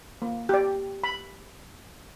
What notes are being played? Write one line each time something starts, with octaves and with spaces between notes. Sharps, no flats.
A#3
G4 D5
B5